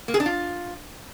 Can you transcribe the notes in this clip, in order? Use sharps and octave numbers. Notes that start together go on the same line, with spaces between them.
A#3
G#4
D4
F4